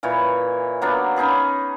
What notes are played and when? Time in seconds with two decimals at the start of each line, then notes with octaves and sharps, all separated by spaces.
0.03 A#2 E3 C#5
0.82 F#3 A#3 B3 D4
1.16 C#4 D#4 G#4 B5